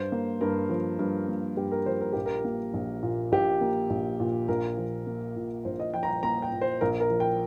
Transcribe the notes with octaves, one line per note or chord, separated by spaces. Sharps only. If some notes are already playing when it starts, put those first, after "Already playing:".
Already playing: G2 C5
A#3
G2 A#4
F3
G2
A#3
G2 G4
A#4
F3 C5
A#4
A#1 G4
A#4
A#3
A#1
A#2
A#1 G4
A#3
A#1
A#2
A#1 A#4
F3
A#3
A#2
A#1 C5
D#5
F3 G5
A#5
G5
A#3 A#5
G5
A#2
C5
A#1 A#4
A#4
F3
G5